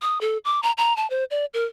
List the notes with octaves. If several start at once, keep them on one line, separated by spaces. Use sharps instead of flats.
D#6
A4
D6
A#5
A#5
A5
C5
D5
A#4